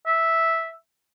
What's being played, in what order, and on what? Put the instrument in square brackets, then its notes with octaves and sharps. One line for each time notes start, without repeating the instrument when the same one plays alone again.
[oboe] E5